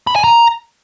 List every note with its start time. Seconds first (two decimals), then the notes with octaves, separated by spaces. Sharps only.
0.07 B5
0.16 G#5
0.24 A#5